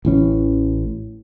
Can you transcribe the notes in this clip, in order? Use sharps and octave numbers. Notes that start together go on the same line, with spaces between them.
A1 E3 C#4